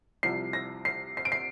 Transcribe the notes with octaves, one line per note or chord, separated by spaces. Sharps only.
C2 C3 F3 C7
A#6
C7
C7
D7
C7